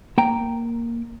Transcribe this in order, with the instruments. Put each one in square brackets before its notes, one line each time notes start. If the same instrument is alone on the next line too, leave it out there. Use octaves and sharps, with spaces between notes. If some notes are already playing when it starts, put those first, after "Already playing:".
[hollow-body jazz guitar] A#3 G5 A#5